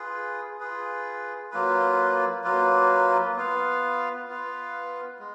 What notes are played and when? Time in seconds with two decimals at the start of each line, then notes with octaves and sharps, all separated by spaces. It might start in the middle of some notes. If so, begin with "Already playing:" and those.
Already playing: F4 G#4 B4
0.60 F4 G#4 B4
1.51 F#3 A#3 F4 B4
2.44 F#3 A#3 F4 B4
3.36 B3 F4 B4 F5
4.27 B3 F4 B4 F5
5.19 G#3